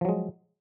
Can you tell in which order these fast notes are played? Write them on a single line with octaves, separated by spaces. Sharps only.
F3 F#3 G#3